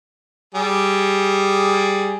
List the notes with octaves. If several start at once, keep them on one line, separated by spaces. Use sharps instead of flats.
G3 G#4